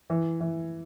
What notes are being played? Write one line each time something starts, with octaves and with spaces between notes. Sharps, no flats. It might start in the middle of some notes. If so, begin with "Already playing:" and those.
E3
E3